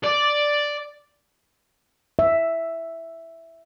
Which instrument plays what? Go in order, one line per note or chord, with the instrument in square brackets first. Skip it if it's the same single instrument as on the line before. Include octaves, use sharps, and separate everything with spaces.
[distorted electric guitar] D5
[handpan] E5